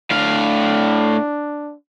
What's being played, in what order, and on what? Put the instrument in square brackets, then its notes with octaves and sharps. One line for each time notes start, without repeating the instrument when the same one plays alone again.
[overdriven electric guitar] A2 F5 [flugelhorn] D4